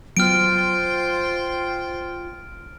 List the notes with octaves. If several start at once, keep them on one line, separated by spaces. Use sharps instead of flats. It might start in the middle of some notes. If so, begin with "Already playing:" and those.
F#3 B3 F4 C5 G5 F6 D7